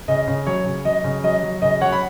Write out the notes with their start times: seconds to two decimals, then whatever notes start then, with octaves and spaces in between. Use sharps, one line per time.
0.08 C#3 D#5
0.27 C#3
0.47 F#3 C#5
0.66 C#3
0.85 F#3 D#5
1.04 C#3
1.24 F#3 D#5
1.43 F#3
1.62 C#3 D#5
1.81 F#3 C#5 F#5
1.92 B5